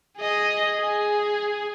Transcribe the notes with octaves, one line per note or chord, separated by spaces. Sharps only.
G#4 D#5
G#4